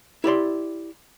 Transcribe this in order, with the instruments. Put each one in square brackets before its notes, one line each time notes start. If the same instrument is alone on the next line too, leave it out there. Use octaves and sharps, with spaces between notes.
[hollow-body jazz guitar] E4 G4 D5 C6